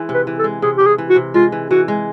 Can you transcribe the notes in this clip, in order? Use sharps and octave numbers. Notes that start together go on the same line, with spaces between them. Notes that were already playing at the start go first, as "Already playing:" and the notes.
Already playing: E3 G#3
C3
B4
E3
A4
G#3
C3 G#4
C3 G4
G#4
E3
F#4
C3
G#3 F4
E3
E3 F#4
G#3